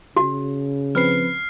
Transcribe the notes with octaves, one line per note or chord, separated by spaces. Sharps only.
C#3 F#4
F3 C4 B4 F6 C7